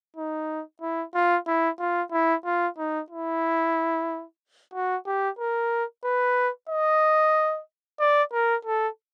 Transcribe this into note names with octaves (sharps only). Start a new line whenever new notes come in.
D#4
E4
F4
E4
F4
E4
F4
D#4
E4
F#4
G4
A#4
B4
D#5
D5
A#4
A4